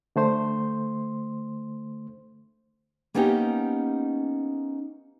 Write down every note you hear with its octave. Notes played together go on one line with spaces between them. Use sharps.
D3 A3 C5 C6
A#3 B3 C#4 D#4 G4